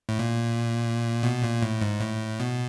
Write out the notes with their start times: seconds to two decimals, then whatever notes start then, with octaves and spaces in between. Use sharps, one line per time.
0.09 A2
0.19 A#2
1.23 B2
1.43 A#2
1.62 A2
1.81 G#2
2.01 A2
2.40 B2